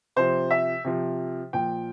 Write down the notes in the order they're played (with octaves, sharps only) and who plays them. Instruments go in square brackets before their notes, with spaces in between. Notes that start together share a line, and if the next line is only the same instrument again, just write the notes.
[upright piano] C3 F3 C5
E5
C3 F3
A#2 F3 G5